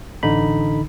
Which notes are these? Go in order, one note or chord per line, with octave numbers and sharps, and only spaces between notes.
A1 D3 D#4 B5